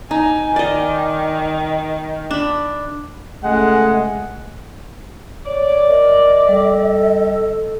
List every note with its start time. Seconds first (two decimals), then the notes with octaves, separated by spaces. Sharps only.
0.11 D#4 G#5
0.56 D#3 D5 D#5
2.31 D4 B5
3.44 C#2 G#3 A3 F#5
5.46 C#5 D5
5.87 A#4 D#5
6.48 G3 A4